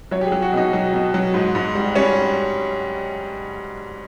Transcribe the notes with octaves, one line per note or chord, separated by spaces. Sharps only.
F#3 C#5
G4
G#4
F#3
F#4
B2 D#4
F#3
B2
F#3
G#2
G#2
G3
G3 C#4